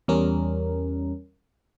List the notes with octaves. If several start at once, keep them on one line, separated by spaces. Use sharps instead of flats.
E2 G3 C#4 A#4